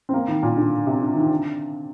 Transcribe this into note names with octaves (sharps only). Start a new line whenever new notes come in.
C4
A#3
D#3
A#2
D3
C3
D3
D#3
D3